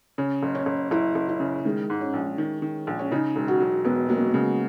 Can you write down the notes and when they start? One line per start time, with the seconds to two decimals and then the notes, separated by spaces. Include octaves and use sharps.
0.18 C#3 C#4
0.43 F#1
0.55 C#4
0.66 F#1
0.91 F#1 E4
1.15 F#1
1.29 E4
1.40 C#3
1.65 D#3 G#3
1.90 G#2
2.01 C#4
2.13 A#1
2.38 D#3
2.62 D#3
2.87 A#1
2.99 C#4
3.11 C#3 D#4
3.36 E1
3.48 F#4
3.60 F#3
3.85 E1 B3
4.09 F#3 A#3
4.18 B3
4.26 A#3
4.33 C#3 G#3